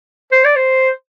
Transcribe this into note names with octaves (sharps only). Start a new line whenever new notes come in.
C5
D5
C5